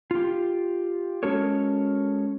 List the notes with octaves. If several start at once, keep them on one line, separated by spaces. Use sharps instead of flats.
F4 G4
G#3 C#4 F#4 A4 A#4 C#5